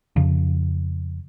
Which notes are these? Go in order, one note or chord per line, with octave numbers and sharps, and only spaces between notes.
F2 C#3 F3